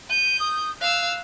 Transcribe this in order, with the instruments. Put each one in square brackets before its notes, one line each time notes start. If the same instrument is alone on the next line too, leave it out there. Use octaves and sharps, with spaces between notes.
[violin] G6 [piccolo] D#7
[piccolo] D#6
[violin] F5 E6 [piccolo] F#6